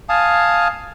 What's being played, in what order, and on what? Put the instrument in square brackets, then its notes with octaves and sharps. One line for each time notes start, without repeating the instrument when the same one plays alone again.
[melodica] F5 G#5 A5 D#6